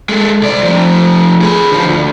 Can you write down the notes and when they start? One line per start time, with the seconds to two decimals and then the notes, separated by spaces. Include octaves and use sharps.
0.09 G#3 A4
0.41 C2 D5
0.63 F3 A3
1.41 G#4 B4
1.72 D3 F3
1.86 D2